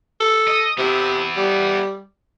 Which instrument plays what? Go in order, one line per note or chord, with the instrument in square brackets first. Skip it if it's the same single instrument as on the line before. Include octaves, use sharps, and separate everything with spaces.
[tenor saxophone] A4
[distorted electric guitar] D#5
[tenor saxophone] C3 [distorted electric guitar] B3 E4
[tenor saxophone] G3